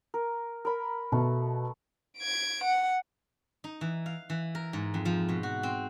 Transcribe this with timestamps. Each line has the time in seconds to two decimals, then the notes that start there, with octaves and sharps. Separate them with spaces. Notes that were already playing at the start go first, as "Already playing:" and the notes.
0.14 A#4
0.65 A#4 B4 B5
1.12 B2 A3
2.18 G#6 D7
2.64 F#5
3.64 D#4
3.81 E3
4.06 F5
4.30 E3
4.55 A#4
4.73 G#2
4.94 F2
5.05 F3
5.29 B2
5.43 F#4
5.63 C4